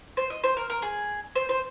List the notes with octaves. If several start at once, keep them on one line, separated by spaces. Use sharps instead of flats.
C5
D#5
C5
A#4
A#4
G#4
C5
C5